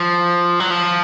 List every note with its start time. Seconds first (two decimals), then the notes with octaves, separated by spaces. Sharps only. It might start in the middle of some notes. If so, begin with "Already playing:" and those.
Already playing: F3
0.60 F#3
0.70 F3